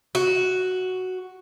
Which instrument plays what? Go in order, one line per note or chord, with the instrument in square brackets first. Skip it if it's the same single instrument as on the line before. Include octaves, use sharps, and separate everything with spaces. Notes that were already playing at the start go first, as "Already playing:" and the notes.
[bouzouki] F#4